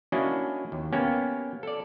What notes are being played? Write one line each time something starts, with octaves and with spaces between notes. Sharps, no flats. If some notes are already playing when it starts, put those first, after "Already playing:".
A#3 C#4 D4 E4 F#4 D#5
D#2
A#3 B3 C#4 G4
A4 D5